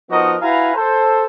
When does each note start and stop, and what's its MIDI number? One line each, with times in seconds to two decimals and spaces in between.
0.10 0.36 53
0.10 0.36 59
0.10 0.36 63
0.10 0.36 66
0.10 0.36 70
0.10 0.36 75
0.42 0.75 64
0.42 0.75 66
0.42 0.75 71
0.42 0.75 77
0.42 0.75 80
0.42 0.75 82
0.75 1.26 69
0.75 1.26 72